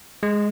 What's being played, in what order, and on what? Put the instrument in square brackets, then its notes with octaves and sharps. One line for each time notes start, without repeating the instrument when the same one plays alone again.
[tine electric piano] G#3